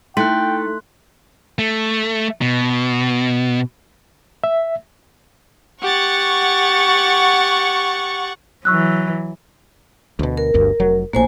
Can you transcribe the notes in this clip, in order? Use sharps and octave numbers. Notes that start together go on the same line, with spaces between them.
A3 D#4 E4 G5 C6 F#6 B6
A3
B2
E5
G4 F#5 C#6 A6
E3 F#3 C#6 E6 F#6
D2 B2
A#4
G1 D2 G2
F1 F#3
A#1 A2 A#3 C5 G#5